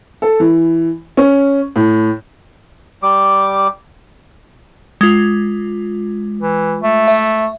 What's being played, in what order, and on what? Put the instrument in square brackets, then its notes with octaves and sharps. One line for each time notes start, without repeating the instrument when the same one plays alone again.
[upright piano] A4
E3
C#4
A2
[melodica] G3 D6
[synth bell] G#3 F4
[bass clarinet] E3
A3
[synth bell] E5